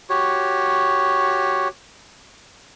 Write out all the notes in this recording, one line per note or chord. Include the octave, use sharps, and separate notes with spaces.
F#4 G4 C#5